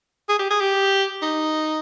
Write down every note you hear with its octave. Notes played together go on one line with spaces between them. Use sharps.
G#4
G4
G#4
G4
D#4